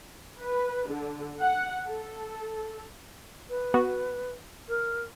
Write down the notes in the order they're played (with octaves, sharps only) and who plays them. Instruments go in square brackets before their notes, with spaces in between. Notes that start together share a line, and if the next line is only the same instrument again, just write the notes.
[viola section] B4
D3
F#5
A4
[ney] B4
[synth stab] B3 F#4
[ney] A#4